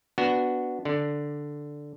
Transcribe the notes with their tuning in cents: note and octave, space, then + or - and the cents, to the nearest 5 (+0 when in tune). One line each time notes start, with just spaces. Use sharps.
B3 +0 D4 +0 F#4 +0
D3 +0 D5 +0